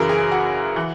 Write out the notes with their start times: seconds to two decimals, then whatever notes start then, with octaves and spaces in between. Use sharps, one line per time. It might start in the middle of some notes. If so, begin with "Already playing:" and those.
Already playing: F#2 C#3 E3 A#4
0.09 G#4
0.32 F#4
0.76 E3